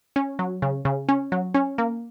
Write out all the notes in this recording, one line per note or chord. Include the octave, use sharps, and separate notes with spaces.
C#4
F#3
C#3
C#3
C#4
F#3
C#4
A#3